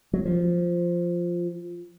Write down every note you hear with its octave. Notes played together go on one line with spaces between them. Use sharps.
F#3
F3